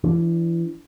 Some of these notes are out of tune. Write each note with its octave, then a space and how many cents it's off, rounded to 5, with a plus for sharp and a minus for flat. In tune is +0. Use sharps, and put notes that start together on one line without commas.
E3 +30 D4 +0